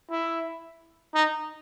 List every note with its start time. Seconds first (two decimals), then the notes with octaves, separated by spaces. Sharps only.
0.10 E4
1.14 D#4